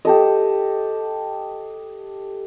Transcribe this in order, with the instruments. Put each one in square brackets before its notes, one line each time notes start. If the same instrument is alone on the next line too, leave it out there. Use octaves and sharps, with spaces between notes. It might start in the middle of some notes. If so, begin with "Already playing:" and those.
[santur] G4 A4 D#5